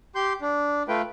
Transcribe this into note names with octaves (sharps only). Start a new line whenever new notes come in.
G4 C6 G6
D4
A3 F4 B4 G5